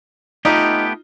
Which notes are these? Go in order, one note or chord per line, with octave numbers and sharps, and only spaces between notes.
A3 B3 D#4 F4 G4